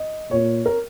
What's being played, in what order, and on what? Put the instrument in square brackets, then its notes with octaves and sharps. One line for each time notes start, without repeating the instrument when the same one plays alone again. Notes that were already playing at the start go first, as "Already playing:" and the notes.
Already playing: [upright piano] D#5
[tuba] A#2 [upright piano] C#5
[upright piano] A#4